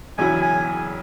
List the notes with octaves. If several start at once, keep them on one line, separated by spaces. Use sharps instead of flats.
E1 E2 C#3 F#3 E4 G#5
G#5